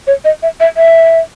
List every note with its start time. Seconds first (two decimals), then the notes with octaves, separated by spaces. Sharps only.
0.07 C#5
0.25 D#5
0.43 E5
0.60 E5
0.77 E5